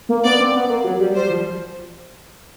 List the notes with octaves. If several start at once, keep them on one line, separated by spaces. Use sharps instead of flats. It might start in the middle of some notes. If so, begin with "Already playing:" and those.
A#3
B3 D5
C4
B3
A#3
F#3
G3
G3 C5
F3